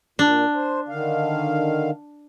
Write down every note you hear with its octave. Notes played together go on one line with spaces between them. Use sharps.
A#2 D4
C5
D3 D#3 F5